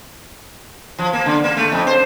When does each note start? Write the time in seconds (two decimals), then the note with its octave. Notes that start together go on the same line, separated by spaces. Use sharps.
0.99 F3
1.13 A#3
1.26 D3
1.44 A#3
1.57 A3
1.72 F2
1.87 C5